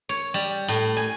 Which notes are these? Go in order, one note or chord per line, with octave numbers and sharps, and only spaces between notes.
C#5
G3
A2
G#5